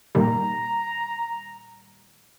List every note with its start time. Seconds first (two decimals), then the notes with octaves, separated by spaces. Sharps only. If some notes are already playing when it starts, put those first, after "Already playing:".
0.15 A#2 D#3 G3 A#5